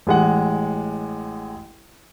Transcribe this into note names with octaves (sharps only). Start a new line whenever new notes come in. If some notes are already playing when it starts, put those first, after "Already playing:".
A1 G#3 F#5